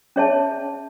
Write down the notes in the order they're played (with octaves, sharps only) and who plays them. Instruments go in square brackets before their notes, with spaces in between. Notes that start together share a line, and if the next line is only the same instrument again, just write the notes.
[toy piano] C#4 G#4 C#5 E5 A5